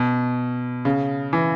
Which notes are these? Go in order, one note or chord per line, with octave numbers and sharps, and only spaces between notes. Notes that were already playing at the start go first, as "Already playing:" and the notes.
Already playing: B2
C#3
E3